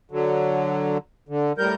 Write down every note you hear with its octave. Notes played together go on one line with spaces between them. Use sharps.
D3 F#3
D3
A2 G3 A#4 G6